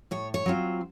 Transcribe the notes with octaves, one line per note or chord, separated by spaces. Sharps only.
A2 C#5
C#5
F#3 C4 F4